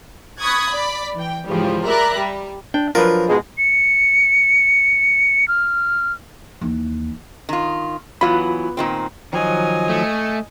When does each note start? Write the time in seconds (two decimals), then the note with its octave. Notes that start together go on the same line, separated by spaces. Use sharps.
0.39 B5 C#6 D#6 F#6 G#6 A6
0.71 D5 B5
1.16 E3 G5
1.47 G#2 C#3 E3 F3 G3
1.87 A#4 D5 E5 A#5 B5 F#6
2.19 G3
2.74 D4 G5
2.95 F3 F#3 D4 F4 A#4 B4
3.28 G#2 B2 G#3
3.58 C#7
5.48 F6
6.61 D#2 E3
7.49 D#3 F4
8.21 E3 F#3 B3 F4 B5
8.77 A#2 D#3 C4
9.33 D#3 F3 F#3 D#5 G#5
9.89 A3